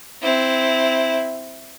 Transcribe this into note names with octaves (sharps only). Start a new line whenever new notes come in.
C4 E4